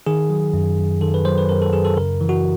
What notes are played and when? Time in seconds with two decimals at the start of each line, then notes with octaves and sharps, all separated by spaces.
0.07 D#3 G#4
0.30 F#3
0.54 F#2
0.78 F#2
1.01 D#3 A4
1.14 B4
1.25 F#3 C5
1.38 B4
1.49 F#2 A#4
1.62 A4
1.73 F#2 G#4
1.85 A4
1.97 C#3 A#4
2.21 E3
2.29 F#4